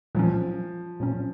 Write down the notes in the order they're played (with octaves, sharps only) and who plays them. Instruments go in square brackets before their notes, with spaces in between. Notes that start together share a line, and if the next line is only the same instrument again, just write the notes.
[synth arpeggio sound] A#2 F#3 C#4 [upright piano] F3
[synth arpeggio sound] A#2 F#3 C#4